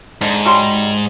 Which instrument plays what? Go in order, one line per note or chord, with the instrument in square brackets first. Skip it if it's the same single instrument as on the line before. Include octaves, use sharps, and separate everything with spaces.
[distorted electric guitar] G#2 [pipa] D3
[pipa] F#3 G3 C6